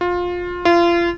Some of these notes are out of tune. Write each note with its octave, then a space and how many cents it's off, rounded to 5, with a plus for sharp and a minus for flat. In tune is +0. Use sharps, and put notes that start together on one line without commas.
F4 +20
F4 -30